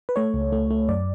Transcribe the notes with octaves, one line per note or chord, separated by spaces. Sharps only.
B4
A3 C#5
C#2
A3
A3
F#2 D5